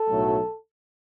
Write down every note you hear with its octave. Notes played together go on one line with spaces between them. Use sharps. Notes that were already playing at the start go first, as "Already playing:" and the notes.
Already playing: A4
B1 A2 F#3 A3